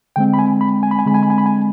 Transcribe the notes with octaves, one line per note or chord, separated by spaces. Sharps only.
D3 G#3 C4 G5
B5
G#5
B5
G#5
B5
G#5
D3 G#3 C4 B5
G#5
B5
G#5
B5
G#5